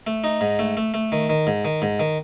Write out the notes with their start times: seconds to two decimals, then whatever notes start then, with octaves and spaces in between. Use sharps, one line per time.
0.07 A3
0.24 D#4
0.41 G#2
0.59 A3
0.77 A3
0.94 A3
1.12 D#3
1.30 D#3
1.47 G#2
1.65 D#3
1.82 G#2
1.99 D#3